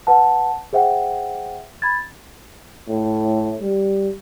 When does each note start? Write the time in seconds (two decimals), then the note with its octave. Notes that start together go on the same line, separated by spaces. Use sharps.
0.07 B4 F#5 A5
0.73 G#4 C5 E5 F#5 G5
1.82 B5 G#6 A6
2.88 A2
3.61 G3